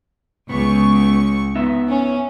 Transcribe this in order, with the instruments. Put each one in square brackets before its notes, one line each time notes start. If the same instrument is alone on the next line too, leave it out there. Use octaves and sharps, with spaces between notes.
[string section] C#2 C#6 [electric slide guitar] B3
[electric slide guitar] B3 D#4 E5
[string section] C#4